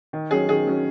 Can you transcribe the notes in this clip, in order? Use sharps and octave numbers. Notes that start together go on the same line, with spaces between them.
D#3
F#3 C#4 G#4
D#3 G#4
F#3 C#4